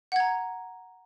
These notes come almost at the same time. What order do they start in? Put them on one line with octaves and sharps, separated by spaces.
F#5 G#6 A#5